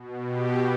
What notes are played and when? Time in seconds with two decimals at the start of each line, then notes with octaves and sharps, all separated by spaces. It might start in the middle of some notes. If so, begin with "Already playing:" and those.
Already playing: B2
0.27 G4